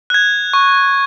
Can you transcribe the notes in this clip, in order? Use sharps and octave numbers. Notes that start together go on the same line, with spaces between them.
F#6 G#6
C#6